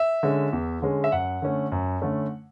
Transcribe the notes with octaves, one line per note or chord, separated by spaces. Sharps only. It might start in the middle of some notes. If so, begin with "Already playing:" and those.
Already playing: E5
D3 G#3 C#4
E2
D3 G#3 C#4
E5
F#2 F#5
D3 A3 C#4
F#2
D3 A3 C#4